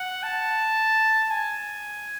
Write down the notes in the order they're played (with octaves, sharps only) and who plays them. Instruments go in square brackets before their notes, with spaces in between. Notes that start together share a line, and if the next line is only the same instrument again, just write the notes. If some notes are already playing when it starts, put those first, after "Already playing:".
Already playing: [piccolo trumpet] F#5
A5
G#5